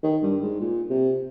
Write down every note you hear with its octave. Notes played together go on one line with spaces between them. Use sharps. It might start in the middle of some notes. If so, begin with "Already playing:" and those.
D#3
G2
G#2
A#2
C3